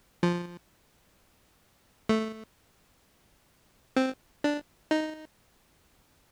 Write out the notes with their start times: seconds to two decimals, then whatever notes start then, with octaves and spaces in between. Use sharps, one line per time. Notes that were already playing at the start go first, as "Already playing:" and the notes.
0.23 F3
2.09 A3
3.96 C4
4.44 D4
4.91 D#4